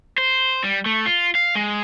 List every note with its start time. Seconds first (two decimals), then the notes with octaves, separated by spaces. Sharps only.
0.18 C5
0.64 G3
0.86 A3
1.06 F4
1.35 F5
1.55 G#3